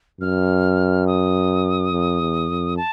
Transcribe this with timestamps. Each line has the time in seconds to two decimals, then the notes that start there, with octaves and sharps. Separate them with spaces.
0.21 F#2 F6
1.07 D#6
1.92 F2
2.21 E2
2.49 F2
2.77 A5